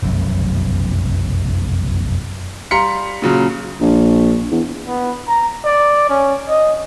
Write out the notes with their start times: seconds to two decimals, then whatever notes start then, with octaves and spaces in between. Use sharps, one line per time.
0.03 F1 B1 F#2
2.71 G3 F5 A#5 C6 B6 C#7
3.22 A#2 C#3 F#3
3.81 A#1
4.51 E2
4.86 B3
5.27 A#5
5.65 D5
6.09 C#4
6.49 D#5